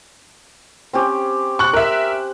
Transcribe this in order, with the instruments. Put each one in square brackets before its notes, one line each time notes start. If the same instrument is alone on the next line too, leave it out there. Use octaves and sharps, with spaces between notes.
[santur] C4 C#4 G4
[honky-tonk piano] C#6 F#6
A#4 E5